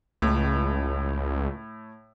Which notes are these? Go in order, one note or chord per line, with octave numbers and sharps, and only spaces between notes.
C#2 A2